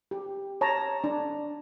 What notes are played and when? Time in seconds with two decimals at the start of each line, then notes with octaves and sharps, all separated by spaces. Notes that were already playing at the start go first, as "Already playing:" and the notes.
0.11 G4
0.61 C#5 A5 A#5
1.04 D4